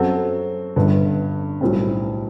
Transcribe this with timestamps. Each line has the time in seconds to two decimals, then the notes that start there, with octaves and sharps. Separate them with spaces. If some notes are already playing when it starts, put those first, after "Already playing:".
Already playing: F#2 F#3 C4 F#4 A4
0.76 G1 G2 D3
1.61 B1 A2 G3 C4